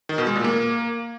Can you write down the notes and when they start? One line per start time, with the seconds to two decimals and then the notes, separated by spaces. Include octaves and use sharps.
0.09 D#3
0.18 B2
0.27 G#3
0.36 A#2
0.44 A#3